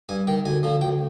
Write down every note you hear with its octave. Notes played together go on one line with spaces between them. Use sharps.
G2 G#5
D#3 G5
D2 G#5
D3 F3
D2 G5